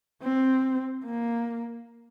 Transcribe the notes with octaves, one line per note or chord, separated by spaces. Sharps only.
C4
A#3